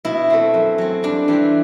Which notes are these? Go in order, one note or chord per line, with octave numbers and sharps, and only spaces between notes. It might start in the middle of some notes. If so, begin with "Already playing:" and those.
B2 E4
A3 C4
F#2
F#3 C4
G2 D4
E3 G3 C4